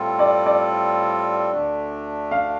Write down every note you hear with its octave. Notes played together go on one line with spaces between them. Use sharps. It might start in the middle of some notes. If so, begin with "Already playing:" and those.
Already playing: A2 G3 C4 F4 A4
D5
D5
D2 D3 A3 D4
F5